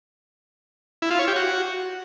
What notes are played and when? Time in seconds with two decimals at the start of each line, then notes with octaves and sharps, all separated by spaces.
1.02 E4
1.11 F4
1.19 C#5
1.27 G4
1.36 F#4